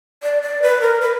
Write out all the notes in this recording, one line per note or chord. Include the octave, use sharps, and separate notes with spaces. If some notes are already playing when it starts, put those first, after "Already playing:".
D5
D5
B4
A#4
B4